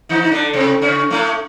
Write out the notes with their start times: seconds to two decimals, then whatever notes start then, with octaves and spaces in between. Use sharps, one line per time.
0.09 D#3 D#4
0.24 D#4
0.32 D3 D4
0.53 C3 C4
0.82 C#3 C#4
1.10 A2 A3